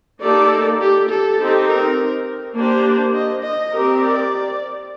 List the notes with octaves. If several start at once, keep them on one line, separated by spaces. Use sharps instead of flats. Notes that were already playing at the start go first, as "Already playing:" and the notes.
A#3 D#4 G4 A4 D5
G4
A4
C4 D#4 G4
A#4
A#3 D4 G4 C5
D#5
D#5
C4 G4 A#4
D5